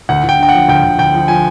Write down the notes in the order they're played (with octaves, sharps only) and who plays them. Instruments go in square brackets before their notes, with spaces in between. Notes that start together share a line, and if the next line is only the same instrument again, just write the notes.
[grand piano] D2 F#5
D2 G5
D3 G5
F3 F#5
D2 G5
D2
D2 G5
F3
F3 G#5